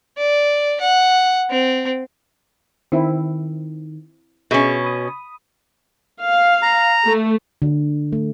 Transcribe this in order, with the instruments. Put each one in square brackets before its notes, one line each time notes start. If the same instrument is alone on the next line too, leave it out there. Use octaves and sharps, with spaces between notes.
[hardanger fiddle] D5
F#5
C4
[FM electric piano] D#3 [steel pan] C4 E4
[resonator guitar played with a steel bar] B2 C#4 [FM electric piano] G#4 E5
[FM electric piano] B5 D#6
[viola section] F5
[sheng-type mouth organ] A#5
[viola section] A3
[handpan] D3
A3